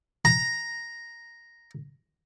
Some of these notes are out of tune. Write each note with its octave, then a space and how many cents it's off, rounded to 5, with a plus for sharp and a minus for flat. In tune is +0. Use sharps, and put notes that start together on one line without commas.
A#5 +0